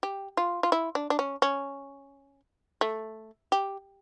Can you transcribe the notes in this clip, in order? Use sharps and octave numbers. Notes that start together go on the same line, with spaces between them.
G4
F4
F4
E4
D4
D4
C#4
C#4
A3
G4